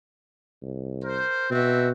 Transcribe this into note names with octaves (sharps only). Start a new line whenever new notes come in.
C2
A#4 C5
B2 C4 F#4 E5